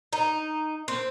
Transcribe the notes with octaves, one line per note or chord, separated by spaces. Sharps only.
D#4
C4